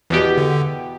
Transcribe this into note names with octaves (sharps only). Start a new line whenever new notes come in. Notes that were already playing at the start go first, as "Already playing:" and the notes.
E2 B2 E3 B3 G4
D3